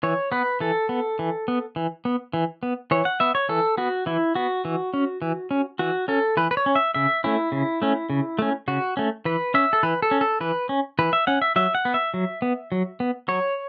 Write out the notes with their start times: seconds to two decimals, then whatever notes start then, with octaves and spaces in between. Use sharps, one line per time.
0.03 E3 C#5
0.32 B3 B4
0.60 E3 A4
0.89 B3
1.19 E3
1.48 B3
1.76 E3
2.05 B3
2.33 E3
2.63 B3
2.91 E3 C#5
3.05 F#5
3.20 B3 E5
3.35 C#5
3.49 E3 A4
3.78 B3 F#4
4.06 E3 E4
4.35 B3 F#4
4.65 E3
4.94 C#4
5.22 E3
5.51 C#4
5.79 E3 F#4
6.08 C#4 A4
6.37 E3 B4
6.51 B4
6.57 C#5
6.66 C#4
6.75 E5
6.94 C#3 E5
7.24 A3 C#4 E4
7.52 C#3
7.82 A3 C#4
8.10 C#3
8.39 A3 C#4
8.68 C#3 F#4
8.97 A3 C#4
9.25 E3 B4
9.54 C#4 E5
9.73 A4
9.83 E3 B4
10.02 A4
10.11 C#4
10.21 A4
10.41 E3 B4
10.69 C#4
10.99 E3 B4
11.13 E5
11.27 C#4 F#5
11.42 E5
11.56 F#3 E5
11.75 F#5
11.85 B3
11.94 E5
12.14 F#3
12.42 B3
12.72 F#3
13.00 B3
13.28 F#3 C#5